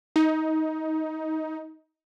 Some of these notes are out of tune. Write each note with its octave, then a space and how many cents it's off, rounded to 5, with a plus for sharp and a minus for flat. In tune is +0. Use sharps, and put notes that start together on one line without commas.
D#4 +20